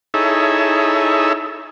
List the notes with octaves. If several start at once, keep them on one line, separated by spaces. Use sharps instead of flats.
D#4 E4 G#4 A4 C#5 E5